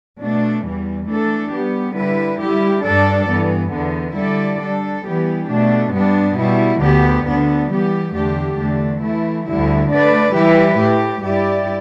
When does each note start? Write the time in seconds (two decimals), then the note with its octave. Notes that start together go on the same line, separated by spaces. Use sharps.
0.20 B2 A3 D4
0.64 E2 E3 G3
1.08 E3 A3 D4 A4
1.52 G3 B3 G4
1.96 D3 G3 E4 B4
2.41 G3 E4 G4
2.85 G2 G3 D4 A4 D5
3.29 G2 E3 B3
3.73 E2 D3 B3
4.17 D3 G3 E4 A4 D5
4.61 G3 D4 A4
5.06 E3 G3 B3 G4
5.50 B2 A3 D4
5.94 G2 G3 B3 D4
6.38 B2 G3 E4
6.82 D2 D3 B3 G4
7.26 D2 D3 B3 D4
7.71 E3 G3 B3 G4
8.15 E2 D3 A3 D4 G4
8.59 E2 D3 A3 D4
9.03 E3 A3 E4
9.47 D2 D3 G3 E4
9.92 D3 A3 D4 B4 D5
10.35 E3 G3 E4 G4 B4
10.80 A2 A3 G4
11.24 G2 G3 E4 G4 D5